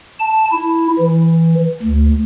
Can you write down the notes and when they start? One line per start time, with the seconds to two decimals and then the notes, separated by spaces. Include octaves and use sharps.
0.20 A5
0.51 E4
0.99 E3
1.83 D2